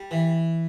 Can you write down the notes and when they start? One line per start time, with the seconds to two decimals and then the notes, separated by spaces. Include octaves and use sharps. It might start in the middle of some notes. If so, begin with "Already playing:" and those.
Already playing: G3
0.11 E3